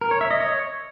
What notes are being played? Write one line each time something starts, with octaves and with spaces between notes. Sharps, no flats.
A#4
C#5
E5
D#5
C#5